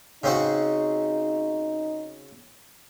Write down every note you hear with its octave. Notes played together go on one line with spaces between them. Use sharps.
C#3 C4 D#4 F#4